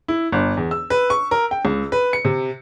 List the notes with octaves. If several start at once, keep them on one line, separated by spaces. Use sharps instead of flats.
E4
G1
E2
E6
B4
C#6
A#4
G5
C#2
B4
C#7
C3